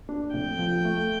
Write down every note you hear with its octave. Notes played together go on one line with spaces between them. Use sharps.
D4
F1 G5
F3
A3